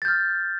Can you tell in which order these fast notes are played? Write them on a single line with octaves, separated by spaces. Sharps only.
A6 G6 F6